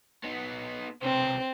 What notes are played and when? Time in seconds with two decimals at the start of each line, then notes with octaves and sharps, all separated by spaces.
0.24 B3 D#4
1.03 B1 C3 C4